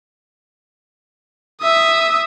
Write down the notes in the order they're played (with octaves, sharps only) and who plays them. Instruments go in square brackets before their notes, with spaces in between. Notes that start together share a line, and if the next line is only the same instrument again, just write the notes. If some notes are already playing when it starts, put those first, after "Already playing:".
[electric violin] E5 D#6